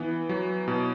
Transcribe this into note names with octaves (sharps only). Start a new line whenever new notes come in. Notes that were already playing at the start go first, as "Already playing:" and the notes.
Already playing: E3 B3
F#3
B2